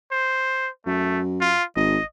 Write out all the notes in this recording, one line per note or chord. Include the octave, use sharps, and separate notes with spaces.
C5
F#2 A3
F4
G#1 D#5